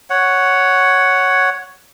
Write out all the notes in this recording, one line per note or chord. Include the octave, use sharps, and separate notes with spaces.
C#5 F#5